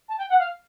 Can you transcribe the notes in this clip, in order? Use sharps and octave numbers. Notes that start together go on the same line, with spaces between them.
A5
G5
F#5
F5